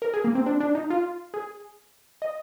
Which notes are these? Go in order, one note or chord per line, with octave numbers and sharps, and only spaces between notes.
A#4
G#4
A#3
C4
D4
D4
D#4
F4
G#4
D#5